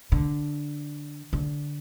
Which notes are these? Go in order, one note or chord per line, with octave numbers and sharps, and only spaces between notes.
D3
D3